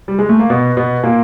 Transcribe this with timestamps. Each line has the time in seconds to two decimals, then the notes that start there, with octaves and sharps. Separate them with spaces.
0.08 G3
0.19 G#3
0.29 A3
0.39 A#3
0.50 B2 B3
0.77 B2 B3
1.03 A#2 A#3